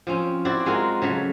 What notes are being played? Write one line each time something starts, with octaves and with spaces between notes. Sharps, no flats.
F3 C4 C#4
C4 E4 F#4 D5
G#3 F4 F#4 A#4
C#3 F#3 A3